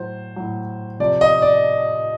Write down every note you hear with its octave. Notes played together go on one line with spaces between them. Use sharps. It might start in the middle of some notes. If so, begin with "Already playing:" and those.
Already playing: A2 F#3 C5
A2 F#3
C3 F3 D5
D#5
D5